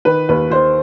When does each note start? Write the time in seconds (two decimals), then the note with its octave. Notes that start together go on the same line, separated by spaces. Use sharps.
0.05 D#3 B4
0.29 D#2 B4
0.50 D#3 C5